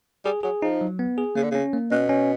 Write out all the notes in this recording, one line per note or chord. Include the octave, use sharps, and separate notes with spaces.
G3 G#4
F#3 G#4
F3 D#4
F#3
B3
G#4
C#3 A#3
D3
C#3 C#4
A#3
B2 C#4
C#4